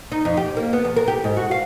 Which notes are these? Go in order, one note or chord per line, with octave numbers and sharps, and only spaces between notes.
D#4
F2
G4
A#3
B3
E2
A#4
G4
G#2
F#4
F5